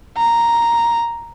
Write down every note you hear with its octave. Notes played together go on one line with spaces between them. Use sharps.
A#5